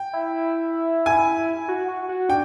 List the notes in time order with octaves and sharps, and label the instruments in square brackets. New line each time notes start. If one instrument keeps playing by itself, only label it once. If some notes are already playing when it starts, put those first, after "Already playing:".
Already playing: [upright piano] G5
[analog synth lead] E4
[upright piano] G#5
[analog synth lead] F#4
F#4
F#4
[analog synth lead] D4 [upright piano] G5